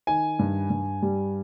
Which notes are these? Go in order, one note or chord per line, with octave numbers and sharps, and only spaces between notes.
D#3 G#5
G2
G2
G3